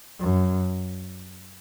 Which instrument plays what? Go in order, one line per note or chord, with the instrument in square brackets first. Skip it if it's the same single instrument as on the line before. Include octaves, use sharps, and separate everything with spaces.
[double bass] F#2